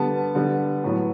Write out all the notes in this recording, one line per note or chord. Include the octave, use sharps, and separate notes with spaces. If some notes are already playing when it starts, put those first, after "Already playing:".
Already playing: D3 G3 B3 A5
D3 G3 B3
A2 F#3 B3